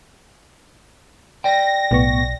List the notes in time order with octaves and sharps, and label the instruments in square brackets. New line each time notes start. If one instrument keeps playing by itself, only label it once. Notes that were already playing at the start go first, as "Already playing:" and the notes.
[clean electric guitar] D5 G5 [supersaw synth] A#6
[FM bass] B1 [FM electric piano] A2 B3 C#6